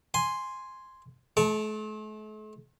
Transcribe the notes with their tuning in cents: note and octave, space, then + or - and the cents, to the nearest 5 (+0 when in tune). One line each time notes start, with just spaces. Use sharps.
G#5 +0 C6 +0
A3 -45 A5 +0 C#6 +0